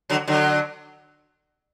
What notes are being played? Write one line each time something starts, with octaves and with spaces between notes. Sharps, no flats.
D3 F#3
D3 F#3